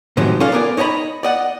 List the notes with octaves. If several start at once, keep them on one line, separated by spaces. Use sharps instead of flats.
A2 C3 D#3 F3 F#3 G#3
C#4 D4 F4 A4 F5
B3 A#4 D5 G#5
D#4 C#5 D#5 G#5 B5
D5 D#5 F#5